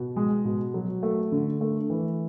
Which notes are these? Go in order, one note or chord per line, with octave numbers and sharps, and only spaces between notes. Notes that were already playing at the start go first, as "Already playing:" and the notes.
Already playing: B2
G#3
B2
F#3
A3
D3
A3
E3